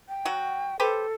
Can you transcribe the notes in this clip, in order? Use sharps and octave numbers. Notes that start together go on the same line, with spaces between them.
G5
F#3 F#4
G4 A4 B4 C5